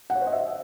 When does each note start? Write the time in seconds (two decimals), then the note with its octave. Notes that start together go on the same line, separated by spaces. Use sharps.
0.10 F#5
0.15 C#5
0.21 C5
0.27 D#5
0.32 E5